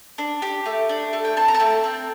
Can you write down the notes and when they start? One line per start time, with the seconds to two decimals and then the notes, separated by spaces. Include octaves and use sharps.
0.18 D4
0.42 G4
0.66 A3
0.89 D4
1.13 A3
1.25 G5
1.37 C4 A5
1.48 A#5
1.54 A5
1.60 A3 G5
1.84 C4